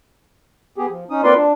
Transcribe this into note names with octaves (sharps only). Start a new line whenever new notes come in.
B3 G4 G#4
F3
C#4 D#4 D#6
A#3 C4 F4 B4 D5 C6
D4